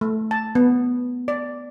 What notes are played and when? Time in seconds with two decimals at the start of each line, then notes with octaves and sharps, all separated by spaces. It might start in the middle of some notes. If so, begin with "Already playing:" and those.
0.01 A3
0.31 A5
0.55 B3
1.28 D5